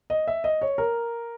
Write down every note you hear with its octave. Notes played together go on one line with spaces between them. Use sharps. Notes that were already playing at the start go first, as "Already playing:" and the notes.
D#5
E5
D#5
C#5
A#4